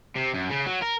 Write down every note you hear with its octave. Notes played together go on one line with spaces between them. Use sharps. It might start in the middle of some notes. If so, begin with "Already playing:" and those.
C3
F#2
C#3
F#3
A#4